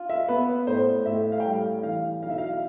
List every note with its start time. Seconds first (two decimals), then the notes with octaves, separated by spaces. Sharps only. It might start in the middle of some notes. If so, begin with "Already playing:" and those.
Already playing: F4
0.09 E5
0.28 B3 B4
0.67 A2 C5
1.06 A2 E5
1.32 F5
1.40 G5
1.45 G3 F5
1.83 E3 F5
2.23 B1 F5
2.30 E5
2.38 F5